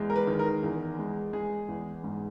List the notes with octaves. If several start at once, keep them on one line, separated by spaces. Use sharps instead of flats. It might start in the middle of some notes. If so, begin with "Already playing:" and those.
Already playing: E2 G#3
A#4
B4
D#3
A#4
E2
G#3
G#3 G#4
E2
G#2